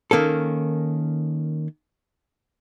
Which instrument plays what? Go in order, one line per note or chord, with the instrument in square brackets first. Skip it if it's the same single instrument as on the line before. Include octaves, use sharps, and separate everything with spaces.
[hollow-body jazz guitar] D#3 A#3 C#4 A4